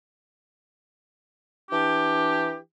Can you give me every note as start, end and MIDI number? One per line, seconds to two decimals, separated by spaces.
1.71 2.57 52
1.71 2.57 62
1.71 2.57 67